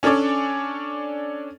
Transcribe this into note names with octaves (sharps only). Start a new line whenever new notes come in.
C#4 D4 A4 C#5 D5